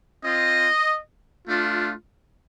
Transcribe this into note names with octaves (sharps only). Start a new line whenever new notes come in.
C4 F4 D#5
A3 D4 F4